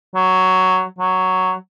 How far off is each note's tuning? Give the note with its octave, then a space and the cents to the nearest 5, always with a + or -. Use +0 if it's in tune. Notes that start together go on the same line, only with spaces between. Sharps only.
F#3 +5
F#3 +5